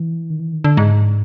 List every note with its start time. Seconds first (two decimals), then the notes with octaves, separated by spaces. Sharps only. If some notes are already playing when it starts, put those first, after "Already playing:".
Already playing: E3
0.30 D#3
0.40 E3
0.52 D#3
0.64 D3
0.77 G#2